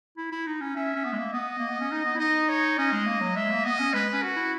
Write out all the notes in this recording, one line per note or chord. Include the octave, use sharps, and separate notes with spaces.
E4
E4
D#4
C#4
C#4 E5
C#4
B3
G#3
A#3
B3 D#5
A#3
B3
C#4
D#4
B3
E4
D#4 D#5
C#5
C#4 D#5
G#3
A#3
F#3
G#3 E5
A#3
B3 D#5
C#4
G#3 B4
C#4
F#4
E4